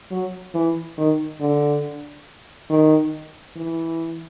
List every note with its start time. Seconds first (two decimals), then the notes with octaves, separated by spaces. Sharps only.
0.11 F#3
0.54 E3
0.98 D#3
1.40 D3
2.70 D#3
3.56 E3